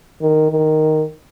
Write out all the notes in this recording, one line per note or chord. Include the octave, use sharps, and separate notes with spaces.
D#3
D#3